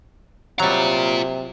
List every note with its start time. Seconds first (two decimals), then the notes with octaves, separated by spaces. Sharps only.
0.60 C3 F#3 G3 F4 A#5